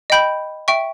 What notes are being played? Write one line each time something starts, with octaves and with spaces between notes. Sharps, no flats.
D#5 G5 B5 G6
E5 G5 C#6